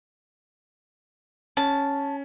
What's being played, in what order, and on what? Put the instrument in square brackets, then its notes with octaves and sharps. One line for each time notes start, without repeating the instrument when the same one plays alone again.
[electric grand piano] C#4 [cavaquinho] A5